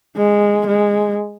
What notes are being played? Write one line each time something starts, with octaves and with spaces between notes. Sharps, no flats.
G#3
G#3